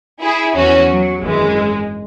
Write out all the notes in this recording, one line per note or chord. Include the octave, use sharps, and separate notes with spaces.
E4 G#4
E2 E3 C#4 F#4
F#3
G#1 F#2 E3 G#3